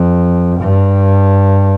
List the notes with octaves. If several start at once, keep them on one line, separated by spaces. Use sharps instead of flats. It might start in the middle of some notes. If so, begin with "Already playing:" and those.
Already playing: F2
G2